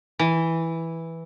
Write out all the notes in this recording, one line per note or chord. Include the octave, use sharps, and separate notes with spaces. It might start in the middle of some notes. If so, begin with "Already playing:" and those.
E3